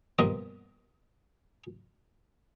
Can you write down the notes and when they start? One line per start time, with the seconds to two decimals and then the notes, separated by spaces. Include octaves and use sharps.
0.19 G2 B2 F3 A#3 D#5